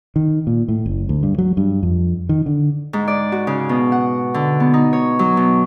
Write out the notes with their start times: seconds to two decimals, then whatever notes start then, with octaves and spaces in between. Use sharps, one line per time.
0.16 D#3
0.47 A#2
0.68 A2
0.86 F#1
1.09 D2
1.23 G2
1.38 F#3
1.57 G2
1.83 F2
2.29 D#3
2.46 D3
2.93 G#2
3.08 D5
3.32 F#4
3.47 C#3
3.69 B2
3.92 F#5
4.34 D3
4.60 B3
4.74 D#4
4.93 C#5
5.19 F#3
5.37 B2